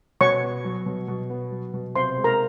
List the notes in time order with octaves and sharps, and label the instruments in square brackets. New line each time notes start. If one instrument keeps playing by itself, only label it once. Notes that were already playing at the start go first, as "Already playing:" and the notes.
[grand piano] B2 [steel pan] C#5 C#6
[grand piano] B3
F#3
B2
B2
B3
F#3
B2
[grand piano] C3 [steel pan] C5 C6
[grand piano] G#3
[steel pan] A#4 A#5